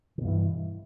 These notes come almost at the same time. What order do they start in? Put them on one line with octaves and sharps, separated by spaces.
D3 B2 G2 E3